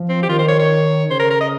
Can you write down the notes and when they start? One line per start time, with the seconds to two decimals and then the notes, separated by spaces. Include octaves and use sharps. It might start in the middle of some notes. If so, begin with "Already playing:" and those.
Already playing: F3
0.09 C4
0.22 G4
0.28 D#3 F4
0.39 C5
0.48 C#5
0.59 C#5
1.10 C#3 C5
1.19 A#4
1.30 A#4
1.40 D#5